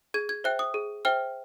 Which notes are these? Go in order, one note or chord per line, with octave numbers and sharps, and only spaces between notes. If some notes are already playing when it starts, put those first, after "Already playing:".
G#4 G#6
G#6
C5 E5 G5 F#6
D#6
G#4
C5 E5 G5 F6